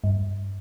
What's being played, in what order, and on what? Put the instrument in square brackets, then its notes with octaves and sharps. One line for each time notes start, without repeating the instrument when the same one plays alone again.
[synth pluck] G2